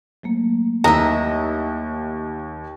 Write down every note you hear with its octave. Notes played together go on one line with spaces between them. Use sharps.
F#3 A3 A#3
D#2 E3 A#4 D#5 E5 A#5 A#6